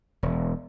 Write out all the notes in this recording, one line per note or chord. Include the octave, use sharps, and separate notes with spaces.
E1